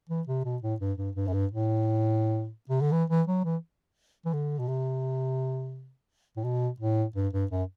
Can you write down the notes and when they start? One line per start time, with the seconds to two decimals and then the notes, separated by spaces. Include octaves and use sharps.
0.09 E3
0.27 C3
0.45 B2
0.62 A2
0.80 G2
0.98 G2
1.15 G2
1.28 F#2
1.33 G2
1.51 A2
2.69 C3
2.81 D3
2.92 E3
3.10 E3
3.27 F#3
3.44 E3
4.26 E3
4.33 D3
4.59 B2
4.68 C3
6.37 A2
6.44 B2
6.80 A2
7.16 G2
7.33 G2
7.51 F#2